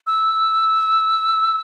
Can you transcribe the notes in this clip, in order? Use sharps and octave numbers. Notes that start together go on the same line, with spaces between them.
E6